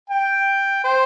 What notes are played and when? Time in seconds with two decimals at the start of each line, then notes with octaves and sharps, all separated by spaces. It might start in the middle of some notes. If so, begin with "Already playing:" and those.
0.10 G5
0.84 C5